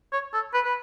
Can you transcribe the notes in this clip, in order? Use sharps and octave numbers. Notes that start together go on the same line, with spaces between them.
C#5
A4
B4
B4